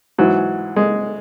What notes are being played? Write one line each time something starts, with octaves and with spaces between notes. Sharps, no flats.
G#2 E3 F#3
G#3